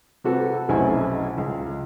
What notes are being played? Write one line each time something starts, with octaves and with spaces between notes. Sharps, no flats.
C3 C4 F#4 A4 B4
F1 B1 C#4 E4 C5 G#5
C#2